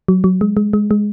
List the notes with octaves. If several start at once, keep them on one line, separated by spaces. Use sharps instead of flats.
F#3
F#3
G#3
G#3
G#3
G#3